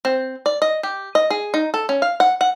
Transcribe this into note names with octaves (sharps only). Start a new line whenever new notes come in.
C4
D5
D#5
G4
D#5
G#4
D#4
A4
C#4
F5
F#5
F#5